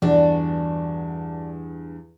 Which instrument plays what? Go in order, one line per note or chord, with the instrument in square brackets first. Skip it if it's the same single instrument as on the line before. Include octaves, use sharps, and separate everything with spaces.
[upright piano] E2 G2 [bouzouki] D4 F#4